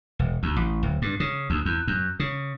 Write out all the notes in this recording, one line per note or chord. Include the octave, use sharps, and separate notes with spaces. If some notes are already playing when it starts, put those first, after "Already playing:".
E1
D2
A1
D1
G2
C#3
D2
E2
F#2
C#3